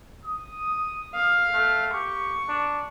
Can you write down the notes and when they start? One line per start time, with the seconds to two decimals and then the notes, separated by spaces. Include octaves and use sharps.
0.25 D#6
1.15 F5
1.53 A3
1.93 G4 C#6
2.48 D4